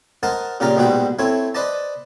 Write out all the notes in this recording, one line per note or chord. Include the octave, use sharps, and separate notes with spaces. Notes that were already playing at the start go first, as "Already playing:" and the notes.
A#4 C5 D#5 F#5 A5 A#5
A#2 C#3 G4 A#4 D5 A#5
A#1 G#2 B2 G3 F#4 G5
A3 C4 E4 C#5
B4 C5 D5 D#5 A5